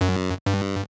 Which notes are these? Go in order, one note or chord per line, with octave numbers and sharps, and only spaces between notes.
F#2
G2